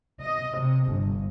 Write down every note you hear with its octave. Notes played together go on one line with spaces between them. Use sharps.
D#5
C3
G1